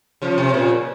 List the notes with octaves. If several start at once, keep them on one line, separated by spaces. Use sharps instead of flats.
C#3 F3
C3
A#2